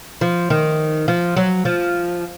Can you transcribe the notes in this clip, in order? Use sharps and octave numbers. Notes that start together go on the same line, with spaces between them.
F3
D#3
F3
F#3
F3